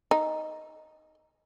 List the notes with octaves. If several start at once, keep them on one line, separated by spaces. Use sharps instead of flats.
D#4